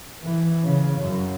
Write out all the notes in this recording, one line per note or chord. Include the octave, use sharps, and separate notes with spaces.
E3
C#3
F#2